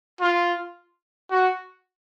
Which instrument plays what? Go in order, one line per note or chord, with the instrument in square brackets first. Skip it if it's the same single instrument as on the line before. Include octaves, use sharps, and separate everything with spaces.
[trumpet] F4
F#4